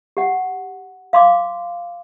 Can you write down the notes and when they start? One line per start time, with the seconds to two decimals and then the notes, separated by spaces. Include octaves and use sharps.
0.17 G4 F#5
1.13 F5 C6 D6